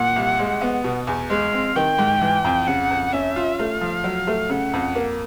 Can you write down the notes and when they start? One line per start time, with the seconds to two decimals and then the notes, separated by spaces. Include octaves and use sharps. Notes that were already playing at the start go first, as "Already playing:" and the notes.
Already playing: A#2 F#5
0.16 C2
0.39 G#3
0.61 B3
0.84 B2
1.07 E2
1.30 G#3 F5
1.53 C4
1.76 D#3 G5
1.99 G#2
2.22 E3
2.45 F2
2.67 C#3 F#5
2.91 F2
3.13 C#4 E5
3.36 F4
3.59 A3 F5
3.81 F3
4.04 F#3
4.27 A3
4.50 C#3 F#5
4.73 F2
4.95 A#3